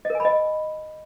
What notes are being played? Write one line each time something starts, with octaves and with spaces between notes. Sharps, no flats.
D#5
A#4
G#5
B5
D#5